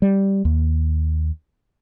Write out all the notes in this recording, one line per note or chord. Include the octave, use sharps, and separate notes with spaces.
G3
D#2